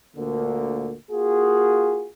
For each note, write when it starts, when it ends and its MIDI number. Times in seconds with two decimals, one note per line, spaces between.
0.16 0.94 38
0.16 0.94 46
0.16 0.94 50
0.16 0.94 58
1.11 2.09 58
1.11 2.09 65
1.11 2.09 66
1.11 2.09 68